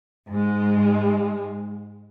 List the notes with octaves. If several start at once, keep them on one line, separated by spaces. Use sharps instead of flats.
G#2 G#3